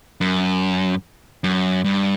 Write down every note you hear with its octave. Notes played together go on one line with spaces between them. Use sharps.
F#2
F#2
G2